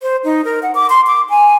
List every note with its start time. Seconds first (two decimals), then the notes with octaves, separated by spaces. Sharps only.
0.02 C5
0.24 D#4
0.45 A#4
0.63 F#5
0.75 D6
0.90 C6
1.07 D6
1.30 G#5